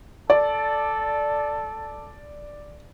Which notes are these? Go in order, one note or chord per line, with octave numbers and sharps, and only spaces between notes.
A4 D5